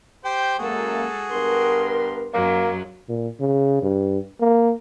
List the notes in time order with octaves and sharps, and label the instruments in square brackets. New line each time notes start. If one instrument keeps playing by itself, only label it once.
[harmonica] G4 C5 G5
[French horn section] F#2 A#3 [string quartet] G#3 A4 [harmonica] F#4 G#4
[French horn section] G2 B3 A#4 [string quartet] C6
[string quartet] F#2 F#3 G#3 [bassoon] A#3
[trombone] A#2
C#3
G2
A#3